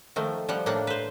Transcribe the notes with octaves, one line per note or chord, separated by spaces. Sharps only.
D#3 F3 A3
F3 G3 F#5
A2 A#3 D4 F#5
B4 C5